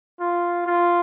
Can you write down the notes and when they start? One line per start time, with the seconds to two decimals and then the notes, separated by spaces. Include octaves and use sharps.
0.20 F4
0.66 F4